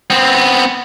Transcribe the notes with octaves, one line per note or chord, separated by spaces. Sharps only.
B3 C4